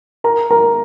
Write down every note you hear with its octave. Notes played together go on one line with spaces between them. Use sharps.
A#4 A#5
A#4 A#5